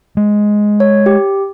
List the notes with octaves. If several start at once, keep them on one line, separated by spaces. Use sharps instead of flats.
G#3
C#5
G4